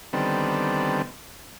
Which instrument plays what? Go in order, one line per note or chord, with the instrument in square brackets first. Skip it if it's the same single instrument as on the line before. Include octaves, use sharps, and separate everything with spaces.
[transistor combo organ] D3 D#3 G3 B3 C4 A4